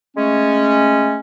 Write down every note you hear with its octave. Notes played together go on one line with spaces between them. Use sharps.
G#3 A3 C#4